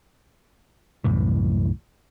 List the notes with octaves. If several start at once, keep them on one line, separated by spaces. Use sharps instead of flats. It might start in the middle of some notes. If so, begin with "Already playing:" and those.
C2 F#2 A2 E3